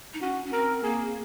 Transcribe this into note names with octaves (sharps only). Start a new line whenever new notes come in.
D#4
C#4 F#4
C#4
C4 A#4
A#3 G#4